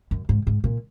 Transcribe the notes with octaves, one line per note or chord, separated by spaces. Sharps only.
F#2
G#2
G#2
A#2